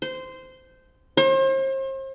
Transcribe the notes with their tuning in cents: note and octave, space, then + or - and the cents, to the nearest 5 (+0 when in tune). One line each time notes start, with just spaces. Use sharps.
C5 -15
C5 +40